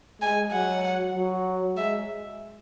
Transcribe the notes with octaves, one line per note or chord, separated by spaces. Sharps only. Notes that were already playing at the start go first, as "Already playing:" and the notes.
G#3 G#5
F#3 F#5
F#3
G#3 E5